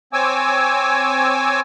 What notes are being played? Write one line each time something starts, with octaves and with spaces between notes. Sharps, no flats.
C4 C#5 G#5 D6 E6